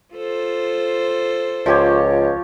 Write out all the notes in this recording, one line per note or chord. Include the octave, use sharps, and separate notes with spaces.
F4 A4 C5
C#2 F3 G4 C#5